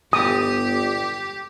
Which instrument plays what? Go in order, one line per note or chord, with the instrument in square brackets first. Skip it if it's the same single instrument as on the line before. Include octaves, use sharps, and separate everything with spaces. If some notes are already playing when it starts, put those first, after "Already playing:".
[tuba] G1 [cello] G4 [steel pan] D#6